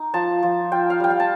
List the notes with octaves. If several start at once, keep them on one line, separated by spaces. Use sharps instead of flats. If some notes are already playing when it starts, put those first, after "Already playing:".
Already playing: D#4
F3 A5
F3
F4 G5
F5
G3 G5
F5
A5